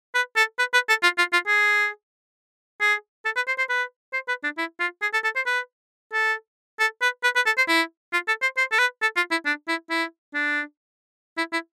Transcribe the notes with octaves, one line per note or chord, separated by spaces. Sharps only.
B4
A4
B4
B4
A4
F4
F4
F4
G#4
G#4
A4
B4
C5
C5
B4
C5
B4
D4
E4
F4
G#4
A4
A4
C5
B4
A4
A4
B4
B4
B4
A4
C5
E4
F4
A4
C5
C5
A4
B4
A4
F4
E4
D4
E4
E4
D4
E4
E4